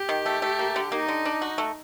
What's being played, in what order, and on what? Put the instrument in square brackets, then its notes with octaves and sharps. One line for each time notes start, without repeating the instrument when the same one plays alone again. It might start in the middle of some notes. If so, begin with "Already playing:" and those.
Already playing: [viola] G4
[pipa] D#3
A3
A3
A#3
D3
[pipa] A#3 [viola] D#4
[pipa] D3
D4
F#4
A3